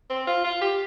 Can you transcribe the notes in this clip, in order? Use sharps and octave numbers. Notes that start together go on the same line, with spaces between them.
C4
F4
F4
G4